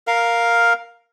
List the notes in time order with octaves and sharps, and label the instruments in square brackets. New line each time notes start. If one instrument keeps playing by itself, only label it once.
[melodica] A#4 F5